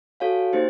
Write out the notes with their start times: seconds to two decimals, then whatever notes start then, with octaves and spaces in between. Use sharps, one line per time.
0.20 F#4 A4 C#5 F5 G#5
0.53 A#3 D#4 G4 C5